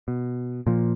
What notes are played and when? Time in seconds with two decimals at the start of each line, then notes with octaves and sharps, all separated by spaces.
0.08 B2
0.67 A#2 F3